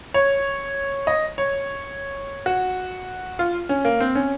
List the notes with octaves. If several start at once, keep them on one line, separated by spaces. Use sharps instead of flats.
C#5
D#5
C#5
F#4
F4
C#4
A#3
C4
C#4